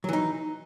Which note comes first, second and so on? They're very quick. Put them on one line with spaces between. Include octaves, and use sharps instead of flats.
F#3 E3 D#4